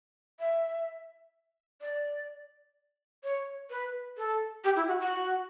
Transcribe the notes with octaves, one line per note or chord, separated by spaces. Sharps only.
E5
D5
C#5
B4
A4
G4
E4
F#4
F#4